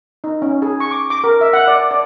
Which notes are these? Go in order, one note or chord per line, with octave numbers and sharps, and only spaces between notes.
D#4
C#4
G#4
C#6
D6
D6
A#4
E5
F#5
D5
D5